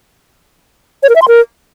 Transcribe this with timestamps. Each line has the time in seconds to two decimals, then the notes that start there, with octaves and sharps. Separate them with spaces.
1.03 C#5
1.09 A#4
1.16 E5
1.22 C6
1.28 A#4